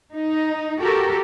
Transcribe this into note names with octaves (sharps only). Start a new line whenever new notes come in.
D#4
F#4 G4 A4 A#4